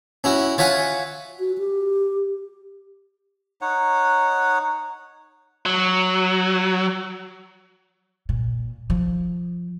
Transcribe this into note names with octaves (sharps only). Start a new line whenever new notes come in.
C#4 E4 F#4
F4 C#5 E5 F#5 G#5
F#4
G4
D#4 C#5 F#5
F#3
A#2
F3